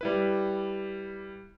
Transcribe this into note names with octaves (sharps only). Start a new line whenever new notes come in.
G3 E4 B4